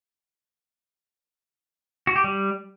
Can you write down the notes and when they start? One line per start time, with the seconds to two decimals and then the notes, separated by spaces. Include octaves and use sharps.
2.07 F#4
2.16 G4
2.24 G3